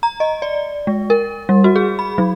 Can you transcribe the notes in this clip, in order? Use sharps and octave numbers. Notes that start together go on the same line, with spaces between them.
A#5
D#5
D5
G#3
A#4
G3
F#4
G#4
B5
F#3